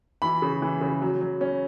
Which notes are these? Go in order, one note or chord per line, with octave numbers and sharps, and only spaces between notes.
E3 B5
C#3
E3
C#3
F#3
F#3
C#4